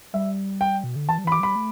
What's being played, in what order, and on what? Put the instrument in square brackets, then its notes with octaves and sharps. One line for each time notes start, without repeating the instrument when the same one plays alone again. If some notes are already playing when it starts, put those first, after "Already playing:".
[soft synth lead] G3 [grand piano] E5
[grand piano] G5
[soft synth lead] B2
D3
[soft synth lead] E3 [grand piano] A5
[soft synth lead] G3
[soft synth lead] E3 [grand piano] B5
[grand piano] D6
[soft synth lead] G3 [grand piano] B5
[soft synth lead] A3